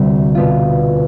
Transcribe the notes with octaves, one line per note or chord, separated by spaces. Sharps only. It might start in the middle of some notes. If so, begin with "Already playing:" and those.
Already playing: D2 C3 G3
B2 B3 F4